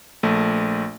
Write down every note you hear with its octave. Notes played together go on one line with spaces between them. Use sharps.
A#1 A3